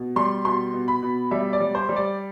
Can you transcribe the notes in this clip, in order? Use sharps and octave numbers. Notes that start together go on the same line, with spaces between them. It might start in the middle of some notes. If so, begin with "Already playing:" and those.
Already playing: B2
G3 C6
B2 C6
B2
B5
B2
G3 E5
D5
G3
C5
G3
D5